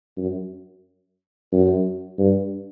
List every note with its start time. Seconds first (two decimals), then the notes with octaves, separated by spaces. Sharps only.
0.18 F#2
1.52 F#2
2.18 G2